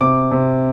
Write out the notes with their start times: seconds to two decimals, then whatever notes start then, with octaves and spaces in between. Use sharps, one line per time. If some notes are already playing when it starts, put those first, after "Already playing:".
0.01 C3 D6
0.31 C3